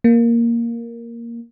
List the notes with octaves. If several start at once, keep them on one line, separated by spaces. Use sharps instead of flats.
A#3